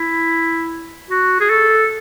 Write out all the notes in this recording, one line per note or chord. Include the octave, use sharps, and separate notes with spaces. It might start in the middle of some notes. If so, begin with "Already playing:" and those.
Already playing: E4
F#4
G#4
A4